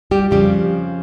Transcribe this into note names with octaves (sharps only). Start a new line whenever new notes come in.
G3 G4
F2 C#3 F3 G3 G4